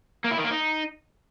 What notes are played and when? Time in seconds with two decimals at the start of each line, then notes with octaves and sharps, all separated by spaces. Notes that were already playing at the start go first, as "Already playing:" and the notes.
0.24 A#3
0.31 E4
0.38 D#3
0.44 A#3
0.51 D#4